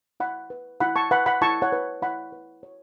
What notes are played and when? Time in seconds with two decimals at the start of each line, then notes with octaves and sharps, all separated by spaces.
0.20 E4 F#5 B5
0.50 B4
0.80 E4 F#5 B5
0.96 A5 C#6
1.11 B4 F#5 B5
1.26 F#5 B5
1.41 E4 A5 C#6
1.62 C#5 F#5
1.72 B4
2.02 E4 F#5 B5
2.32 B4
2.63 C#5